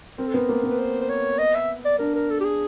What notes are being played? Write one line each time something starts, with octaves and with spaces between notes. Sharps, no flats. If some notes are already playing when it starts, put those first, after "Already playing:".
C4 A#4
A4
B3 A#4
A#3
B3
B4
C5
C5
C#5
D#5
E5
D5
D4 A#4
A#4
A4
G4
G#4